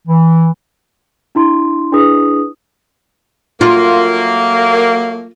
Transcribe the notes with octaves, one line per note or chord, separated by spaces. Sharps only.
E3
D4 E4 C6
D4 E4 G#4 B4 D#6
F#3 A3 A#3 F4